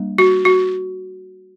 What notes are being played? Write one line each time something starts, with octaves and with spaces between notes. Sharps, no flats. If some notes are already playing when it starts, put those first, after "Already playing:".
Already playing: G3 A#3 D4
F#4
F#4